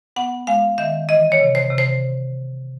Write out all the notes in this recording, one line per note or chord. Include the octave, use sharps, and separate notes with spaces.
B3 F#5
G#3 F5
D#3 E5
E3 D#5
C#5
C3
C5
C3
C5